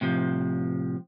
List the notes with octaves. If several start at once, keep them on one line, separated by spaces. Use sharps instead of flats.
A2 C3 F3